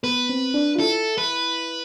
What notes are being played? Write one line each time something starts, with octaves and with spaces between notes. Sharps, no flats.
B3 B4
C4
D4
F4
E4 A4
B4